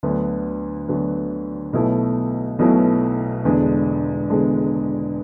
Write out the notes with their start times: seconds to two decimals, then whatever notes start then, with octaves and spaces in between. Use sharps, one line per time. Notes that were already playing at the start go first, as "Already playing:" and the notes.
0.03 D2 D3 F#3 B3
0.88 D2 D3 F#3 B3
1.73 B1 B2 F#3 A3 E4
2.59 B1 B2 F#3 A3 E4
3.44 E1 E2 D3 G#3 D4
4.30 E1 E2 D3 G#3 D4